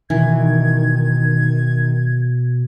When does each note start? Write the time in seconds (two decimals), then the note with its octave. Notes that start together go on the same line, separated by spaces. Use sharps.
0.10 B2 D#3 E3 G#6